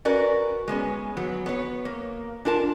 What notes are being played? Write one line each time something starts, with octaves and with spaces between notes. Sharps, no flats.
C#4 F#4 A#4 B4 D5
G#3 B3 C#4
F#3 B3
B3 C#5
A#3
D4 F4 A#4 A5